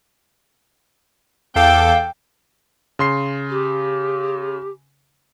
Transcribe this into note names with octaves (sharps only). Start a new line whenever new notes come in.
E2 A4 F5 G5 D6
C#3 C6 C7
G4